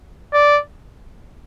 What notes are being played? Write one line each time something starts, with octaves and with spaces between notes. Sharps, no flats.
D5